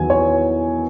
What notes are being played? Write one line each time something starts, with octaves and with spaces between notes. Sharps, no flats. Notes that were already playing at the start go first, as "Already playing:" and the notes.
Already playing: E2 D#3 F#3 G#5
C#5